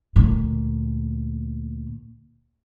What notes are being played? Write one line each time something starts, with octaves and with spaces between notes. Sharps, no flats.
D2 A#2